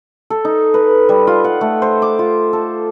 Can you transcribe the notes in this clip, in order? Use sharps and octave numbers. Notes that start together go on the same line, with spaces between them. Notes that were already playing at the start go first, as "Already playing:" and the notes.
A4
D#4
B4
G3
F4
F#5
A3
C5
D6
F4
A4